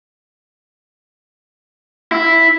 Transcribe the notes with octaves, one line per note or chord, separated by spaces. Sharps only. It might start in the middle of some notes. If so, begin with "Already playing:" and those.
E4